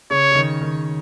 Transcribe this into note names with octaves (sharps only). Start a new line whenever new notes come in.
C#3 C#5
C#3
D#3
D#3